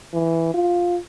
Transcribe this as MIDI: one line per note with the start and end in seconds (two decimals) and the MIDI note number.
0.13 0.52 52
0.54 0.98 65